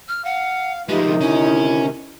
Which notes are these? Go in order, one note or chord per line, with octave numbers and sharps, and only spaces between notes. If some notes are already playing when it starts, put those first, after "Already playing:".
F6
F5 F#5
F3 G#3 A3 D#4 F4 G4 B4
D2 C3 D#3
C#4 E4